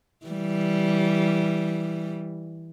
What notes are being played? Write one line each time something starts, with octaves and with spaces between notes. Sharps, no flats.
E3 G3